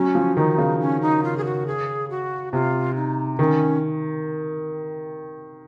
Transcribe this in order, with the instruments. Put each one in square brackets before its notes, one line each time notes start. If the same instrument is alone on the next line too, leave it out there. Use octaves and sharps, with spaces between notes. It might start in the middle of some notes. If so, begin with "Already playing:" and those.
Already playing: [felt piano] F#3 [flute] C#4
[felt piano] F3
[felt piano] D#3 [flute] D#4
[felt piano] C#3
[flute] C#4
D#4
F4
G#4
F#4
G#4
F#4
[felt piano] C3 [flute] F4
[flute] D#4
[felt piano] D#3 [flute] C#4